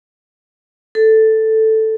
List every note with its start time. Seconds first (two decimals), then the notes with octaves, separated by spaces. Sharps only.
0.95 A4